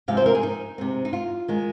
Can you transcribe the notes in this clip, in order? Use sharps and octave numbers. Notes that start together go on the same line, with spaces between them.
C3 F3 G#3 C4 F5
C5
A#4
G#4
D#4
C3 G#3 C4
D#4
F4
D#3 G#3